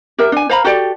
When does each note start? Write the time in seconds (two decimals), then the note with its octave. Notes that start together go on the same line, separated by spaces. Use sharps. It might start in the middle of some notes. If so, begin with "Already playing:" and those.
0.18 G4 A#4 E5
0.32 D4 G#5
0.49 C5 F5 A#5 B5
0.64 F#4 G4 A4 D5